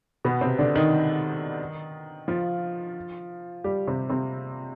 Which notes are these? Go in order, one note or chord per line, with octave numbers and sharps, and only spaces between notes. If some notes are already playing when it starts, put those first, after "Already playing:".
B2 B3
C3 C4
D3 D4
D#3 D#4
F3 F4
G3 G4
C3 C4
C3 C4